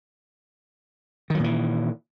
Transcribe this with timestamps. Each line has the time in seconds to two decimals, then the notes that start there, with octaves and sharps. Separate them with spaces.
1.30 D#3
1.35 F#3
1.39 A#2
1.44 E3